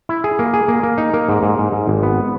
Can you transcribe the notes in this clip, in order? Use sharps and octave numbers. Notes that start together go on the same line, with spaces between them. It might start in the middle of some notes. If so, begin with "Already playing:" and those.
E4
G#4
A#3
G#4
A#3
A#3
D#4
A#3
G#2
G#2
G#2
G#2
G#1
B3